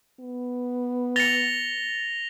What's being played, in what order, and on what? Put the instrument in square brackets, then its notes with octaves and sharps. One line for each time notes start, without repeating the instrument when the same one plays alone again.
[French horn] B3
[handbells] A6 C#7 [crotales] A#6 F7 G7